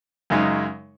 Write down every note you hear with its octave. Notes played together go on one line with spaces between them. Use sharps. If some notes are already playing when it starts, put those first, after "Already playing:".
F#2 C#3 G#3 D#4